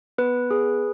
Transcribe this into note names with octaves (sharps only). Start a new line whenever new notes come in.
B3 B4
G#4